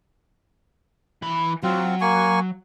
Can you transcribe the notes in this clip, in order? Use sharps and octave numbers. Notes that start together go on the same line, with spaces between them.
E3 B5
F#3 C4 F4
A#3 G#5 C#6